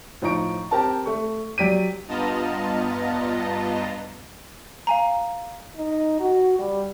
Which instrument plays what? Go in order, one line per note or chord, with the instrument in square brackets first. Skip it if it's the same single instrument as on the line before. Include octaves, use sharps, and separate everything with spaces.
[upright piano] A2 F3 D#4 A#5 C#6 D7
C4 G4 A#4 A5
A3 C#6
F#3 G4 D5 B6 D7 D#7
[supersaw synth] G2 B3 F4 D#5 A5 A#5
[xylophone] F5 G#5 A#5
[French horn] D#4
F#4
G3